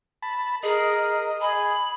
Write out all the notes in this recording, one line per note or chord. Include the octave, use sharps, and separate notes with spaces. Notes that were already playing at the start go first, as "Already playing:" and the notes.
A5 B5
G#4 A#4 D#5
G#4 B5